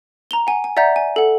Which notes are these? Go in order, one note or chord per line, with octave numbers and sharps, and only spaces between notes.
A#5 F7 G7
F#5 G#5
G#5
D5 E5 F#5 A#5 G6
G#5
A4 F#5